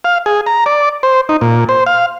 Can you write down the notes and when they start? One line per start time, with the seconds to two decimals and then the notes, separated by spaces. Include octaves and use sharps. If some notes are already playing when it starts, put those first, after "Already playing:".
0.05 F5
0.26 G#4
0.46 A#5
0.66 D5
1.03 C5
1.29 D#4
1.41 A#2
1.69 C5
1.86 F5